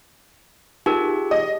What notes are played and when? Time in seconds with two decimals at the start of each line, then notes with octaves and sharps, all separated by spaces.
0.86 D#4 F4 G4 G#4 A#4
1.31 D#5